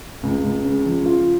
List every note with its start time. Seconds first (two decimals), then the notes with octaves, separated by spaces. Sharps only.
0.23 C#2
0.44 C#2
0.64 C#3
0.85 F3
1.06 F4